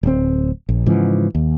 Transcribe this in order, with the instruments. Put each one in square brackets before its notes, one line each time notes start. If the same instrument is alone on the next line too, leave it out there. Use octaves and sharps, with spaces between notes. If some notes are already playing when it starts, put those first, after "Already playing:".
[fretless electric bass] D1 C4
A#1
G#2 C#3 E3 F3
D#2